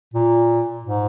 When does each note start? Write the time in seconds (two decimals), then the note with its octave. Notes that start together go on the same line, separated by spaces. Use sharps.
0.14 A#2
0.83 G#2